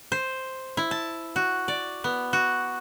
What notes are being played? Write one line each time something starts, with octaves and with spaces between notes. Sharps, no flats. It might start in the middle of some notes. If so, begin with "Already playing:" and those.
C5
E4
A5
F#4
D5
B3
F#4